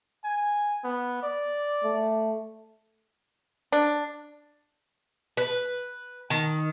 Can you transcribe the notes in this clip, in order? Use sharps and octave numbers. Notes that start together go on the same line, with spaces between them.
G#5
B3
D5
A3
D4
B4
D#3